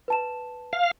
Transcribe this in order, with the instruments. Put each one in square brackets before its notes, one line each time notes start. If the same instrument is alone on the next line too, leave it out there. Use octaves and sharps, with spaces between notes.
[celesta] B4 A5 E7
[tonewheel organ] F5